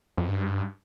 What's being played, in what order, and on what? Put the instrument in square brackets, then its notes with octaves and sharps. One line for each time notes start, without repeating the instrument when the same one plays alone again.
[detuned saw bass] F2
G2